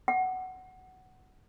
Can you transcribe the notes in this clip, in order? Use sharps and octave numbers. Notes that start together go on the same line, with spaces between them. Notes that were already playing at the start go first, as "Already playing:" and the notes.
F#5